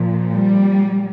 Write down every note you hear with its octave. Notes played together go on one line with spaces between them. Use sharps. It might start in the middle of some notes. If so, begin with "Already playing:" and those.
Already playing: A#2 F3
G3